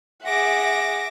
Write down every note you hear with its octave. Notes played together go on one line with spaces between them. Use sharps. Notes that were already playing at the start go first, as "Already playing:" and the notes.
G#4 E5 F#5 D6 A#6